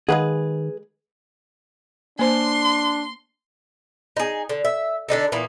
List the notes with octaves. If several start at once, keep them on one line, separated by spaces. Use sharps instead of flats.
D#3 G#3 G#4 B4 F5 F#5
A#3 D4 C5 C6
D#4 G#4
D3
E5
D3 D4 D#4 A4
A#2 E3 A#3 B3